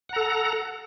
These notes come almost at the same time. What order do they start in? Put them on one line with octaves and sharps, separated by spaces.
F#5 A#5 A4